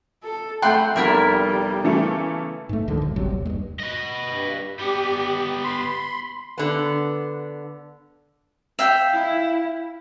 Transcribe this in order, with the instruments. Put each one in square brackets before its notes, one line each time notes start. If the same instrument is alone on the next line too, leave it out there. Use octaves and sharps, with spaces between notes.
[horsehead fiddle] A4
[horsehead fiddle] A3 [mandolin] F#5 C6 [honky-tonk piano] G5 B5 G6
[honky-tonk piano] F1 [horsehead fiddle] G3 [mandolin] B3 E4 A#4
[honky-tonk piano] C#3 E3 A3
[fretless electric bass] G#2 A3
C#2 D3 D#3 F3
E1 B2
A1 C3 F#3 G3
D#2
G2 G#3
[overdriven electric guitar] B4 D#5
[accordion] G2
[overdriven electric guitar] G3 B3 [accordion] G4
[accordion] B5 C6
[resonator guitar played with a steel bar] D3 B3
[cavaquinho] E5 F5 G5
[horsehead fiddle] E4